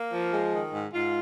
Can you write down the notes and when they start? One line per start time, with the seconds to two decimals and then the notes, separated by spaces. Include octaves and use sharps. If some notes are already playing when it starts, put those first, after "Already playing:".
Already playing: A#3
0.13 F3
0.34 G#3
0.54 D#3
0.74 G#2
0.94 G#2 F4